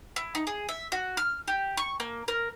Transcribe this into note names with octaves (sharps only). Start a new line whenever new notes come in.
E4
D#4
G#4
E5
F#4
F6
G4
C#6
A#3
A#4